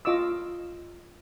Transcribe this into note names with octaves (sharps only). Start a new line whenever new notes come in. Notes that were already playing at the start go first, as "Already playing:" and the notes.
F4 D#5 C#6 D6 E6